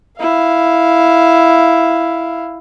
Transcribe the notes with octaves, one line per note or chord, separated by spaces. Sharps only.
E4 F5